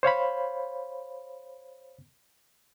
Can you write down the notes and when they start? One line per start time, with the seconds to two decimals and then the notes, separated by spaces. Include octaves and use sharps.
0.03 C5 C#5 F5 B5